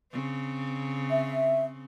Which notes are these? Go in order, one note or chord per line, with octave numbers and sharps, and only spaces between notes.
C#3 C4
E5